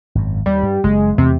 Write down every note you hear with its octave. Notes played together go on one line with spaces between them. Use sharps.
G#1 F#2
D#2 G3
G2
F#1 G#3
E2 C3 A3